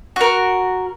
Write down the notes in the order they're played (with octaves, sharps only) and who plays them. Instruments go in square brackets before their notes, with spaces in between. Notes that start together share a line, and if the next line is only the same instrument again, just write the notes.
[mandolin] F#4 A#4